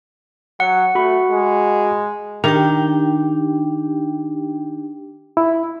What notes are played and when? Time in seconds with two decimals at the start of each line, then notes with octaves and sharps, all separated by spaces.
0.60 F#3 F#5
0.95 A3 F#4 B5 C#6
1.31 G#3
2.44 D#3 D4 G4 G5
5.37 E4